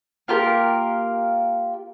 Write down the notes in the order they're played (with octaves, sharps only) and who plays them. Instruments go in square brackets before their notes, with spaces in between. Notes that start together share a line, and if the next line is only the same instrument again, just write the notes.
[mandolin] A#3 F4 G4 A#4